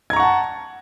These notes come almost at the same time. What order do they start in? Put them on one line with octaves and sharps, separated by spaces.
G#6 A#5 C#6 F#5 A5